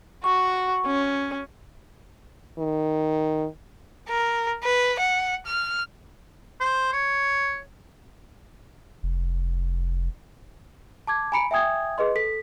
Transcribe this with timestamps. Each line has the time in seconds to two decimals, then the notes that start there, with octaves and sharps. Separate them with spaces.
0.24 F#4 C#6
0.86 C#4
2.59 D#3
4.09 A#4
4.64 B4
5.00 F#5
5.46 F6
6.60 C5
6.93 C#5
9.03 F1
11.07 A5 D6 G#6
11.32 G#5 A#5 B5 C#7 D7
11.51 E5 G5 G#5 D#6 G#6
11.98 G#4 B4 D#5 C6
12.16 A4 B6